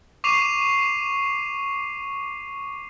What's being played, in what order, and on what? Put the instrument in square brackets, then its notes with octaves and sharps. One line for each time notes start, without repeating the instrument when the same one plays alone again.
[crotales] C#6 D6 C7 D#7 F7